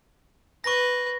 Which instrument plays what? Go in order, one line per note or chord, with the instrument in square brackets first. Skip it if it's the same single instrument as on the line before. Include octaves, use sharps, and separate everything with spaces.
[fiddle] B4 [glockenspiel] C#6 A#6